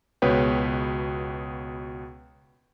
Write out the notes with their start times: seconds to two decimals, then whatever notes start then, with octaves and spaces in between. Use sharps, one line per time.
0.22 C#2 B2 B3 B4 C#5 G5